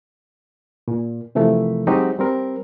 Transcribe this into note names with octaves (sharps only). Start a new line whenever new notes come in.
A#2
C3 E3 F3 A3 A#4
F#3 G#3 C4 D#4 F#4 G4
G3 C4 A#4